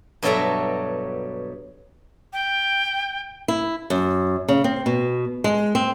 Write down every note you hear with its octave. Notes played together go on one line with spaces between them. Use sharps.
G2 B2 F#3 A4 E5 A#5
G5
E4
F#2
C#3
C4
B2
G#3
C4